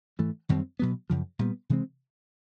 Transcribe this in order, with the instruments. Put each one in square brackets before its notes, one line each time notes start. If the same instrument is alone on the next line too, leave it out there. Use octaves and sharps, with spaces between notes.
[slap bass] G#2 E3 A3
F#2 D#3 G3 C4
B2 F#3 B3
F#2 C#3 F3
A#2 G3 B3
C3 E3 G#3 C4